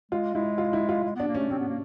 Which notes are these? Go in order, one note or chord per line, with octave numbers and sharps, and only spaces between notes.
G#3 F4
G#3 E4
F4
E4
F4
G#3
B3 D4
A#3
A3 C#4
C4 C#4
B3
A#3